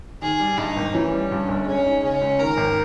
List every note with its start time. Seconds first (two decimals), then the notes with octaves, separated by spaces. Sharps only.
0.22 D#3 G#4
0.40 G3
0.58 G2 D#4
0.76 G#1
0.94 E3 C#4
1.12 G3
1.31 G2
1.49 G1
1.66 G#3 C#4
1.85 D#4
2.03 C#3 C#4
2.21 C#2
2.39 D#3 A#4
2.57 G#1